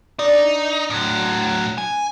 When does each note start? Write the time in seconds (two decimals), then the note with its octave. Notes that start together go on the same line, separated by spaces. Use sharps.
0.19 D4 D#4 D5
0.90 A2 F#3
1.78 G#5